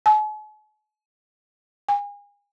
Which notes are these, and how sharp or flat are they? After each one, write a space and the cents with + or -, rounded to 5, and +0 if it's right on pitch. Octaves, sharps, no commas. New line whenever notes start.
G#5 +45
G#5 -35